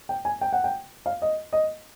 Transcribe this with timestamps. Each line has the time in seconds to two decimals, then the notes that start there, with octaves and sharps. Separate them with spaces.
0.09 G5
0.25 G#5
0.41 G5
0.53 F#5
0.64 G5
1.06 F5
1.22 D#5
1.53 D#5